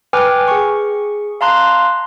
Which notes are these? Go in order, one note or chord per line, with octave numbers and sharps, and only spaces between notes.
B4 G5 G#5 D6 F6
G#4 C#6
F5 A5 A#5 C6 F#6